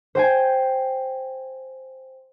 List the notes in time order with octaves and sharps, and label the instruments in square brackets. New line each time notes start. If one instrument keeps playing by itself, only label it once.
[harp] C5 G5 G#5